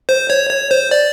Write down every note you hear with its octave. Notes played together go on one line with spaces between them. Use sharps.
C5
C#5
C#5
C5
D5